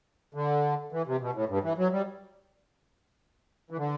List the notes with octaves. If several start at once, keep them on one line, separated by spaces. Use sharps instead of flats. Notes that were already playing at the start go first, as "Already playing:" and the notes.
D3
E3
C3
B2
A2
G2
E3
F#3
G3
E3
D3